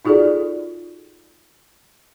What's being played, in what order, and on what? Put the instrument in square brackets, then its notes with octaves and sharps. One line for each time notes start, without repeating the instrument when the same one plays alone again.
[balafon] D#4 F4 F#4 G#4 A4 D5